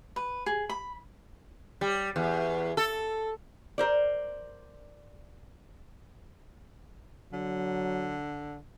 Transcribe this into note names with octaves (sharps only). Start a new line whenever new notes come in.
B4
G#4
B5
G3
E2
A4
A#4 C5 D5
D3 F#3